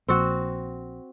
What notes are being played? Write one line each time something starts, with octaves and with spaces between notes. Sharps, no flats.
A#1 C4 F#4